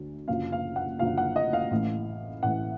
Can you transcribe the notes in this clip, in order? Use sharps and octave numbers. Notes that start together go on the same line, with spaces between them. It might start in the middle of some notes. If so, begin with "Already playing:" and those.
Already playing: D2 D3 F#3
F#1 F#2 D3 F3 F5
F5
F#5
F#1 F#2 D3 F3 F5
F#5
D#5
F5
A1 A2 E3
A1 A2 E3 F#5